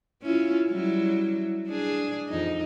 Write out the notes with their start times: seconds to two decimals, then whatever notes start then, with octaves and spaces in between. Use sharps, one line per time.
0.22 C#4 E4 F4
0.69 F#3 G3 E4
1.67 D4 G#4
2.29 F2 D#4